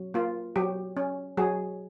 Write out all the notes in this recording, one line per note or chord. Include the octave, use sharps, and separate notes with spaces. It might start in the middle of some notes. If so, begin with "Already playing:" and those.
Already playing: F#3
A#3 F4
F#3 G4
C#4
F#3 G#4